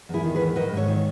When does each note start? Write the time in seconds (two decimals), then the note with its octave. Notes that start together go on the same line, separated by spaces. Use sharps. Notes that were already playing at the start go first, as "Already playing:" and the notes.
0.09 E2 E4 G#4
0.24 D#3
0.35 G#4 B4
0.40 E2
0.56 D#3 B4 D#5
0.71 G#2
0.77 A4 C#5
0.88 D#3 C#5